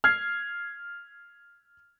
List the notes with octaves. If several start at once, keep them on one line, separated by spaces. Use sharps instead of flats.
F6 G#6 C7